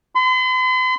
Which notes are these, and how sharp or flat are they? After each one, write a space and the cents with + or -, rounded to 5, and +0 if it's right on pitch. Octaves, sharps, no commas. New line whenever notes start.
C6 -45